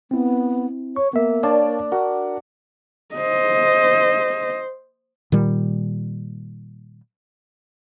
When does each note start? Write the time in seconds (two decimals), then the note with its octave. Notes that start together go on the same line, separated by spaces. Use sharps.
0.11 B3 C4 E4
0.96 C#5 C#6
1.13 A#3 B3 E5
1.43 D4 C#5 F5 A5
1.92 F#4 A#4
3.15 C5 D#5
5.32 A#2 D#3 G3